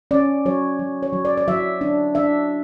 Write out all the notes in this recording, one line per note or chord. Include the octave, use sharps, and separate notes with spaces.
C#4 D5
F#3 C#5
F#3
C#5
F#3
D5
D5
F#3 E5
D4
D4 E5